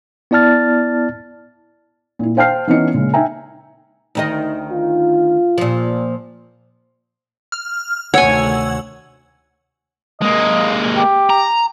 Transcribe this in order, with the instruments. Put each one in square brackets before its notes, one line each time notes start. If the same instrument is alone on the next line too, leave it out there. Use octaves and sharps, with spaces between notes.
[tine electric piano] B3 E4 D5 A5 F6 A6
[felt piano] A#2 E4
C5 F5 G5 A5 F6 C7
E3 B3 C#4 D#4 D#5 C#7
A#2 C#3 G#3
D#4 E5 G5 G#5 A#5
[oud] D2 D#3 D#5
[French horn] F4
[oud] A#2 F3
[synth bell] F6
[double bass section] D2 C3 D#3 [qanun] C#5 G#5 [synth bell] F#5 E6 G#6
[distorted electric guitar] G#3 A#3 [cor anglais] D#5
[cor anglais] G4
[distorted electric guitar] A#5